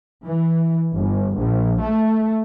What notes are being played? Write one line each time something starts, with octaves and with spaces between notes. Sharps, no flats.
E3
G1
A#1
A3